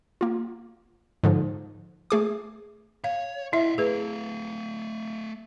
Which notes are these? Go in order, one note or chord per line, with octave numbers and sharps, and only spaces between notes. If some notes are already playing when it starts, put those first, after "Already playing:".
A#3 F4
G#2 D3 F3
A3 G#4 D6
C#5 F5
E4 D#5 E5 F#5
A3 G#4 B4 F5